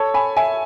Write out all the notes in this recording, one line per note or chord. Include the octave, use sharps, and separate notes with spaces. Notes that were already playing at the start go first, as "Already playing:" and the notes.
Already playing: A4 C#5
G#5 B5
E5 G#5